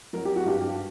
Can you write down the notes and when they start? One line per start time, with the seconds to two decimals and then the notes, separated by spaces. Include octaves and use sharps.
0.13 F#3 A#4
0.25 G4
0.36 F#4
0.45 G2 G4
0.61 G4